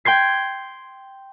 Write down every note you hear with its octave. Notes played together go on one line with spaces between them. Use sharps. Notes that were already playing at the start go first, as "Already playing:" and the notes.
G5 C6 G#6 C7